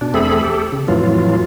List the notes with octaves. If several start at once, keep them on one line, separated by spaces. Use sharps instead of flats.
B2 D4
E2 A3 C4 G#4 A4 B5
G4 A4
C#3
F2 A2 E3 F#3 F4